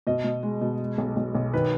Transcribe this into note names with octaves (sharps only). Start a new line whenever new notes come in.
B2 D#5
B2
G#3
B2
G#3
B1
B1
B1
D#3 B4